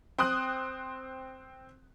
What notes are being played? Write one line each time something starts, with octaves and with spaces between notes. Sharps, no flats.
C4 C6 D#6 F#6